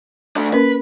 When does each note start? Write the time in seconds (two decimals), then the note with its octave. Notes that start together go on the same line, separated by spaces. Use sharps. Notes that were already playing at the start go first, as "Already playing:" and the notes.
0.36 A3 D4
0.53 A#3 C#4 A#4 B4